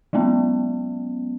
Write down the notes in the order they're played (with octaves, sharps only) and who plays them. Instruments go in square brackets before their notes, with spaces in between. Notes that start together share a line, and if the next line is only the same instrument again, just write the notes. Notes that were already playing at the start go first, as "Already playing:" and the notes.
[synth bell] F#3 G#3 B3 C#4